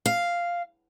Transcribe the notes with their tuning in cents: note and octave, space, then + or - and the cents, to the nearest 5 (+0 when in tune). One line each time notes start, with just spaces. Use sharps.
F5 -5